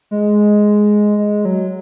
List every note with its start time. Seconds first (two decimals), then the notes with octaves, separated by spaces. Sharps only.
0.11 G#3
1.18 G#3
1.45 F#3